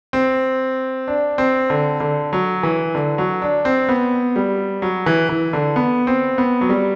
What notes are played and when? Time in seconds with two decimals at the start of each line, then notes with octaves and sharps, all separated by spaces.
0.13 C4
1.08 D4
1.38 C4
1.70 D3
2.00 D3
2.33 F#3
2.63 E3
2.95 D3
3.18 F#3
3.42 D4
3.65 C4
3.89 B3
4.36 G3
4.82 F#3
5.06 E3
5.29 E3
5.53 D3
5.76 B3
6.07 C4
6.38 B3
6.61 F#3
6.69 G3